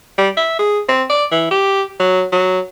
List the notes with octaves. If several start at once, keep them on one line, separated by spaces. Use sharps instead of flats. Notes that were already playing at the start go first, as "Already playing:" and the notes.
G3
E5
G#4
C4
D5
E3
G4
F#3
F#3